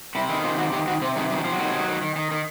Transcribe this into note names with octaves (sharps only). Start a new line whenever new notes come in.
C3 E4
D#3 E4
C3 F4
D#3 F#4
D#3 G4
D#3 F#4
C3 C4
D#3 G#3
D#3 G3
F#3
C3 F3
F#3
D#3
D#3
D#3
D#3
D#3
D#3